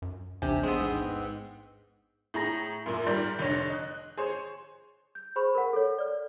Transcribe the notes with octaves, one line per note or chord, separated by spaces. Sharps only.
F#2
A1 D#2 C3 D4 G4 G#5
G#3 B3 C4
G#2
A2 G#4 A#5 A#6
F#2 A#2
G#2 G3 A#4 C6 G6 A6
F1 D3 C#5 A#6
D#5 F#6
G#4 C5 C#5
G6
G#4 C5 B5 C#6
A#4 F#5
A4 C#5
D5 F6